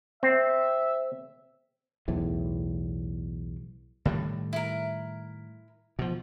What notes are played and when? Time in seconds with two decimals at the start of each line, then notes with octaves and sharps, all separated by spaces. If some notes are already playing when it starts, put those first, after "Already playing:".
0.23 C4 E5
2.08 B1 E2 A2
4.05 A2 D#3 G3
4.53 E4 A#4
5.99 B2 F3